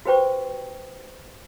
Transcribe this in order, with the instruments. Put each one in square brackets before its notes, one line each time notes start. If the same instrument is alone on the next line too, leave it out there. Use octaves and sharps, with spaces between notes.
[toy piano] F#4 G4 B4 C5 G5 C#6